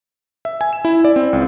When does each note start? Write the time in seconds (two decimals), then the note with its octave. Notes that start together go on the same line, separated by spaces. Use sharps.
0.45 E5
0.61 G#5
0.73 E7
0.85 E4
1.05 D5
1.16 C4
1.33 C#2